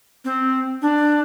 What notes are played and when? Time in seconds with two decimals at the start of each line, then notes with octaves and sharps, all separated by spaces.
0.25 C4
0.82 D4